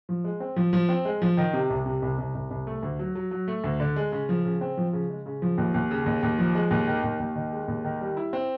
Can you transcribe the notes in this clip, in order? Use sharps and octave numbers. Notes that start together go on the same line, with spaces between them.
F3
G#3
C4
F3
F3
C4
G#3
F3
D#3
C3
C2
C3
C2
C2
C2
C2
A3
D2
F#3
F#3
F#3
A3
D2
D3
G#3
C#3
F3
C#3
C4
F3
C#3
G#3
C#3
F3
D#2
D#2
C#3
D#2
D#2
F3
G#3
D#2
D#3
D#2
D#2
D#3
G#3
D#2
D#3
G3
E4
C4